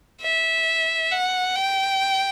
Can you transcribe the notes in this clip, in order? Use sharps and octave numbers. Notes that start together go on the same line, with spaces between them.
E5
F#5
G5